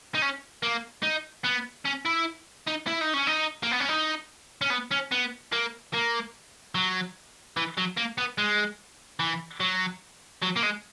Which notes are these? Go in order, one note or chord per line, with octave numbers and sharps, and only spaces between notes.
D#4
C#4
A#3
D#4
B3
C#4
E4
D#4
E4
D#4
C#4
D#4
A#3
B3
C#4
D#4
C#4
B3
C#4
B3
A#3
A#3
F#3
E3
F#3
A#3
B3
G#3
E3
F#3
F#3
A#3
G#3